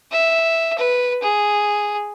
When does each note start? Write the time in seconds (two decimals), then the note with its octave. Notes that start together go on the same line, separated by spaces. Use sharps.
0.11 E5
0.78 B4
1.22 G#4